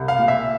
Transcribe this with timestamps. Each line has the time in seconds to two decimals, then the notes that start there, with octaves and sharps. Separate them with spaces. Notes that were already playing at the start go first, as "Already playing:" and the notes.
Already playing: C2
0.08 F5
0.18 A#2
0.28 E5